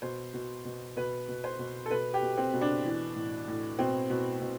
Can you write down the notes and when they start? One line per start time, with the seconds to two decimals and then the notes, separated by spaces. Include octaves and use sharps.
0.02 B2 C5
0.34 B2
0.65 B2
0.96 B2 B4
1.28 B2
1.44 C5
1.59 B2
1.86 A4
1.91 B2 B4
2.14 G4
2.22 B2
2.37 C4
2.53 B2
2.61 D4
2.85 E3
3.16 A2
3.47 A2
3.79 B2 C4
4.10 B2
4.41 B2